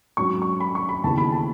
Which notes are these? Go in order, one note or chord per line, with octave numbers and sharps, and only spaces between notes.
G#2 F#3 C#4 C#6
C#6
B5
C#6
B5
D#2 C#3 E3 B3 A5
B5
A5